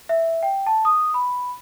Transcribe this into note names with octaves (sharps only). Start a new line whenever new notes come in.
E5
G5
A5
D#6
B5